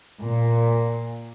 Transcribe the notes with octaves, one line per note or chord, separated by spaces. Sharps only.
A#2